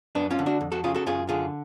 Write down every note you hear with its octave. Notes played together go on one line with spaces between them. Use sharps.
F#2 B3 D4
C#4 F4
D3
D4 F#4
F2
F#4 A4
C#3 F4 G#4
F#4 A4
F#2 F4 G#4
D3 F4 G#4